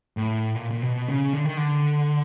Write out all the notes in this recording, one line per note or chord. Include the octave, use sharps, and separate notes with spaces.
A2
A#2
A#2
B2
C#3
D3
D#3
D3